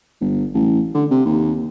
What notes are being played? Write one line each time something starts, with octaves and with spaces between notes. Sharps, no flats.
G1
A1
D3
C3
D#2